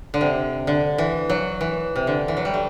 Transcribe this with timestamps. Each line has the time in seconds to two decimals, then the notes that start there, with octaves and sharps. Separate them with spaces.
0.14 D3
0.21 C3
0.67 D3
0.98 E3
1.29 F#3
1.61 E3
1.96 C3
2.07 D3
2.28 E3
2.37 F#3
2.45 G3
2.54 A3